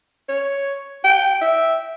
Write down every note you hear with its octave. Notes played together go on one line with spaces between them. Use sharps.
C#5
G5
E5